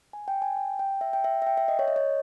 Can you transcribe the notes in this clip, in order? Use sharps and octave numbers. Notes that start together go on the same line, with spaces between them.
G#5
G5
G#5
G5
G5
E5
G5
E5
E5
G5
E5
D#5
C#5
D#5
C#5